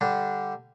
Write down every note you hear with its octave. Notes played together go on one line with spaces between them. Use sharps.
D3 G3 D4